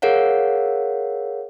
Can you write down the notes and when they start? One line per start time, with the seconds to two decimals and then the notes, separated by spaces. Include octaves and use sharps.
0.02 G#4 A#4 C#5 F5 F#5